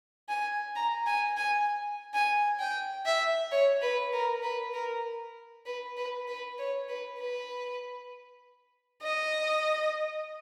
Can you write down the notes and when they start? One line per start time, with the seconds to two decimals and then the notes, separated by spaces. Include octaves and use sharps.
0.29 G#5
0.76 A#5
1.06 G#5
1.37 G#5
2.14 G#5
2.59 G5
3.06 E5
3.52 C#5
3.82 B4
4.13 A#4
4.43 B4
4.74 A#4
5.66 B4
5.97 B4
6.27 B4
6.58 C#5
6.89 B4
7.20 B4
9.03 D#5